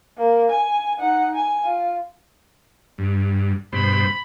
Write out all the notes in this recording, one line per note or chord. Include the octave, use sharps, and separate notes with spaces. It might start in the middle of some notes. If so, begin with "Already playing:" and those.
A#3
G#5
D#4 F#5
G#5
F4
G2
G2 B2 C5 B5